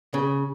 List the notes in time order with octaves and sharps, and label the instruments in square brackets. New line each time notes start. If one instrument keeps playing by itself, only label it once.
[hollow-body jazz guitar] C#3